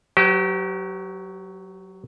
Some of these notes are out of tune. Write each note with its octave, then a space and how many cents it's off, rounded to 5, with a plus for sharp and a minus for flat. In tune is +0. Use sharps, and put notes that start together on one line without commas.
F#3 +0 G4 -30 B4 +45